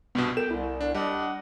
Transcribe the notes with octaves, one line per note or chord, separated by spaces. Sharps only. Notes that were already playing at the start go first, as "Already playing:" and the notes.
C2 G2 B2 B3
A4 A#4 G5 E7
C2 E4
D4
G3 D4 D#5 F#5